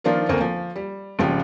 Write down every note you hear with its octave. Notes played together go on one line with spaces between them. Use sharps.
D#3 F3 D4 F4 A#4
D2 A#3 C4
F3
G3
G#1 C#3 F3 G4